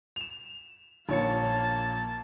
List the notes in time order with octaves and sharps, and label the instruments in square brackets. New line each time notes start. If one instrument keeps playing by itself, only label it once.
[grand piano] E7 F7
[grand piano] A#1 C#5 C#7 [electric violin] A#3 A5